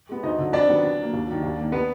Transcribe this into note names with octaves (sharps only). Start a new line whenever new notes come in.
G#3 B3
D2 D#4 D#5
D3 F#3
F2 D4 D5
D#3 F#3 B3
B2
F#3
A#3
D#2
D#3 F#3
D#2
D#3 A#3
B3 B4